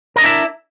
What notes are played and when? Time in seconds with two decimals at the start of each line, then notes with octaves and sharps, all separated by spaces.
0.16 A#4
0.18 D#5
0.21 D4
0.23 E4
0.26 E5